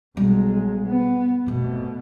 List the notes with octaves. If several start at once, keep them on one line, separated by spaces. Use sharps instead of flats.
B1 G3 G#3
B3
F1 G#2 B2